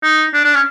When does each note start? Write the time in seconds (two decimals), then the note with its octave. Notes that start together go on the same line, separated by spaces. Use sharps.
0.03 D#4
0.34 D4
0.44 D4
0.54 C#4